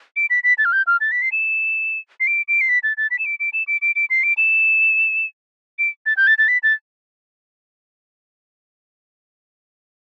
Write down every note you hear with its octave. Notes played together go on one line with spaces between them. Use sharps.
D7
B6
B6
A6
F6
G6
F6
A6
B6
C7
E7
C7
D7
D7
C7
B6
A6
A6
B6
E7
D7
D7
E7
D7
D7
D7
C7
D7
E7
D7
A6
G6
A6
A6
B6
A6